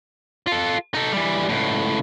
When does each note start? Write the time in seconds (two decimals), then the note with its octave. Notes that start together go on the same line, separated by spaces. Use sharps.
0.47 F4 A4
0.94 D#4 A4
1.12 E3 G3
1.49 C#2 A2